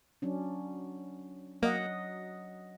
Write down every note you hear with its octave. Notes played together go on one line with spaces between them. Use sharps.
F#3 C#4 D4
F#3 A#3 D#5 F#5